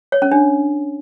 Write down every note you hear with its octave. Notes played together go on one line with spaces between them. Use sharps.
C#5
C#4
D4